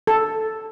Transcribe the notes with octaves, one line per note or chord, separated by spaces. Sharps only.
A4